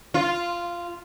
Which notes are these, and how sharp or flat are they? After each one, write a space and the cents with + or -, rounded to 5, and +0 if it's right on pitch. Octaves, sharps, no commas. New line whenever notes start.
F4 -10